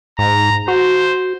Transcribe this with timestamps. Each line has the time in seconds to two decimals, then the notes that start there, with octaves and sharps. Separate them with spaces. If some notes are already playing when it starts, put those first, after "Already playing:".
0.19 G#2 A#5
0.68 F#4 C5